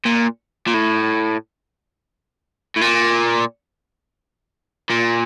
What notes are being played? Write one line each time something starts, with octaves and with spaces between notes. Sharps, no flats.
A#2
A#2
A2
A2
A#2
A#2